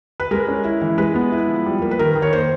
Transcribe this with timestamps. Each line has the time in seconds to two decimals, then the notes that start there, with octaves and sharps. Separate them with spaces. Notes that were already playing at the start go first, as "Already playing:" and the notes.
0.20 B4
0.31 G#3 A#4
0.48 C#4
0.65 E4
0.82 E3
0.98 G#3 B4
1.15 B3
1.32 E4
1.48 F3
1.66 G3
1.82 A#3
1.91 B4
1.99 D#3 A#4
2.15 D#3
2.22 C#5
2.32 A#3 C5